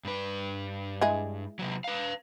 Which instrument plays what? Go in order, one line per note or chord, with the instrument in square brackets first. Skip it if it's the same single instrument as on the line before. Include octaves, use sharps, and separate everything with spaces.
[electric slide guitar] G2 B4
[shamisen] G#3 E4 G#4
[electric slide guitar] C3 F#3
B4 F5